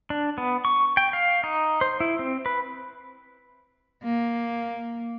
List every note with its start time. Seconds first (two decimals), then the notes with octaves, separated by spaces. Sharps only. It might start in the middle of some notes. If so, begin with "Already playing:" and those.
0.10 D4
0.38 B3
0.65 C#6
0.97 G5
1.13 F5
1.44 D#4
1.81 C5
2.00 E4
2.19 C4
2.46 B4
4.04 A#3